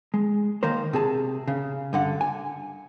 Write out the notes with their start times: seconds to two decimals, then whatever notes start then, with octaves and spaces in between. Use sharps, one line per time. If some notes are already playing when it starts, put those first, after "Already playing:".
0.14 G#3
0.63 D#3 A#3 A#4 C5
0.93 C3 G#4 A5
1.48 C#3
1.93 G2 D3 F#5
2.21 G#5